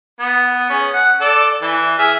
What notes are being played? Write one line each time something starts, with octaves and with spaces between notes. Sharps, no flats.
B3
C#4 G#4
F#5
A4 D5
E3
G#4 E5 F6